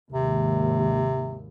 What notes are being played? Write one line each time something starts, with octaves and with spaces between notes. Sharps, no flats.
G#1 D#2 C3